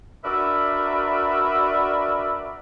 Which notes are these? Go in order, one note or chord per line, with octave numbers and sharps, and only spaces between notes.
D4 F#4 A#4 B4 D5 E5